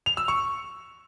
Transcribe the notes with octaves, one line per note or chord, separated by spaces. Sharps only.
F7
E6
C#6